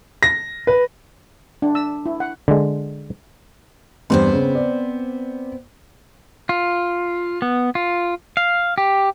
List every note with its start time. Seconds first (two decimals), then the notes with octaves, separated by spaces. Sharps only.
0.23 A#6
0.67 B4
1.62 D4
1.75 E6
2.06 E4
2.20 F#5
2.48 D3 G#3
4.10 E2 G2 B3 C4 C5 C6
4.33 C#3
4.55 D5
6.49 F4
7.42 B3
7.75 F4
8.37 F5
8.78 G4